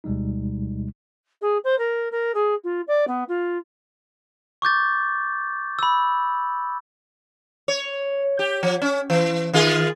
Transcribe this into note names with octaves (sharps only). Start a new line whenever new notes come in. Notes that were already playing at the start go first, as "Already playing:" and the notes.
D2 B2 G3 G#3 D#4
G#4
C5
A#4
A#4
G#4
F4
D5
B3
F4
C#6 D6 G6 A6
B5 E6
C#5
G4
F3
C#4
E3
D#3 F4 G#4